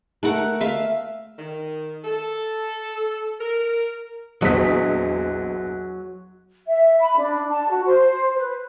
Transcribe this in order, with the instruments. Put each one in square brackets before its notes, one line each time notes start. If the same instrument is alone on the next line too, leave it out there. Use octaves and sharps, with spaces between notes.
[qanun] A3 A#4 F#5
E5 F5
[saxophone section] D#3
A4
A#4
[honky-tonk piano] A#1 E2 B6 [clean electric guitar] F#3 [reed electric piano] D#5
[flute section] E5
B5
D4
A5
F#4
C5
B4